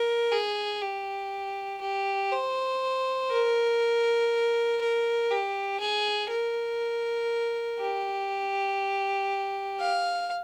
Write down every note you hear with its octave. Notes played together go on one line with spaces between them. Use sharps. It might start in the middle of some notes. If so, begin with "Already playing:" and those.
Already playing: A#4
G#4
G4
G4
C5
A#4
A#4
G4
G#4
A#4
G4
F5